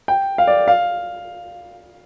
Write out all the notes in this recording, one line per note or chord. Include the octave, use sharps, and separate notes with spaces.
G5
F5
D5
F5